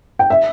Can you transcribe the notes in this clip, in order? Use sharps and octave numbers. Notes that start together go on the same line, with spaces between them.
G5
E5